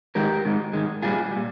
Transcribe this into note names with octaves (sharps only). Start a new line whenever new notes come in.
G#2 D#3 G#3 G4 A#4
G#2 D#3 G#3
G#2 D#3 G#3
A#2 G3 F4 G#4
A#2 G3